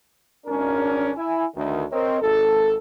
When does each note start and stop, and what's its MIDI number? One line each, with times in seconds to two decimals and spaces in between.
0.46 1.10 32
0.46 1.10 61
0.46 1.10 62
0.46 1.10 70
1.16 1.45 64
1.16 1.45 80
1.55 1.83 38
1.55 1.83 51
1.91 2.21 60
1.91 2.21 70
1.91 2.21 73
1.91 2.21 75
2.21 2.76 32
2.21 2.76 69